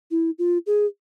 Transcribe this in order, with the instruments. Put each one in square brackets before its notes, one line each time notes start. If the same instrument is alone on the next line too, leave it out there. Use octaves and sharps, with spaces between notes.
[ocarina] E4
F4
G#4